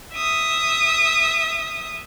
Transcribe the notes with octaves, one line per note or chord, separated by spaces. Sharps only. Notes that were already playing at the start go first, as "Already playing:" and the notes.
E5 D#6